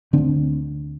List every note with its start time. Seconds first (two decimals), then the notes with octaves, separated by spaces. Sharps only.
0.13 D2 D3 C4 D4